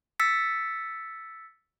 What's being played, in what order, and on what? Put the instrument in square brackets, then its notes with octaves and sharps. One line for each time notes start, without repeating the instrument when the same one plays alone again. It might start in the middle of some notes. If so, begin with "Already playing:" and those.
[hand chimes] E6 A6 B6 C#7